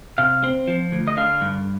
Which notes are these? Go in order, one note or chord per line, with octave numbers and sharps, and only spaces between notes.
C3 F5
C4
F3
D2
D#5
D3 F5
G2